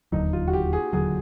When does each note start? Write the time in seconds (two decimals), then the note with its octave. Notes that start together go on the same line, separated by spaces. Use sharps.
0.12 E1 D#2 D3 F#3 D#4
0.33 F4
0.48 F#4
0.53 G4
0.73 G#4
0.93 E1 D#2 D3 F#3 G#4